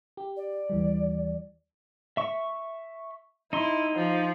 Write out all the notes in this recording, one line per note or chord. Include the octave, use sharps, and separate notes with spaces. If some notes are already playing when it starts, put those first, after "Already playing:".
G4
D5
D#2 E3 G3
E5 C#6
D#4 E4 C6
F3